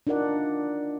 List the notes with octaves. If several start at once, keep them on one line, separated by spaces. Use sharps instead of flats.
D4 D#4 F4 A#4 D5 F#5